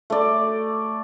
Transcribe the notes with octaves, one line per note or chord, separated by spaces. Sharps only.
A3 D5